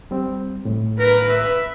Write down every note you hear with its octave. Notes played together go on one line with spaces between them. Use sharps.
G3 C4
A2
A#4 B4
E5